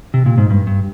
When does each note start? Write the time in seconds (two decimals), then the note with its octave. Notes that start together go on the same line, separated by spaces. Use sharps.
0.14 C3
0.26 A#2
0.38 G#2
0.50 G2
0.67 G2